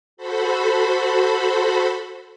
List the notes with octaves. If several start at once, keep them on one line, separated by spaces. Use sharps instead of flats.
F#4 A4 C5 B5